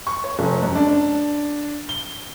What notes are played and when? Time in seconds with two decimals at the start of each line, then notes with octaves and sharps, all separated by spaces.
0.07 C#6
0.24 C#5
0.39 F1
0.63 F#2
0.75 D4
1.89 G7